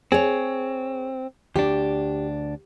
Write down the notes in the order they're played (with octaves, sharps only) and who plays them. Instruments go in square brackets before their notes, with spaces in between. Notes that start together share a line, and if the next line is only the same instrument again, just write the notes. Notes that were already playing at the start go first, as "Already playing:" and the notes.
[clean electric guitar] C4 [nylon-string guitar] G#4 C#5
[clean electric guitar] D2 D4 [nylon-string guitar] G4